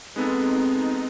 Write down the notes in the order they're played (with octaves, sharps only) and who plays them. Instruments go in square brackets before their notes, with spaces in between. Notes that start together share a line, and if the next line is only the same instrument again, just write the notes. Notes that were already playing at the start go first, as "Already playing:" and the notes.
[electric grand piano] G#3 B3 A4 [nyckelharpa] C4 [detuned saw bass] D#4